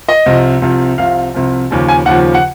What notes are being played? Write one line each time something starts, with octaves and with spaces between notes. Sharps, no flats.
D#5
C2 C3 F3
C2 C3 F3
C2 C3 F3 F5
C2 C3 F3
D#2 C#3 F3
G#5
D#2 C#3 F3 F#5
F#5